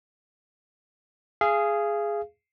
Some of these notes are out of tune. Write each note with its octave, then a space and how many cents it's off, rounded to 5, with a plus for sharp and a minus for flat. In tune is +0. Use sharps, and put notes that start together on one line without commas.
G#4 +0 F5 -30